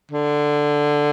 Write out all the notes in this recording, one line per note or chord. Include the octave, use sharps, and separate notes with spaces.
D3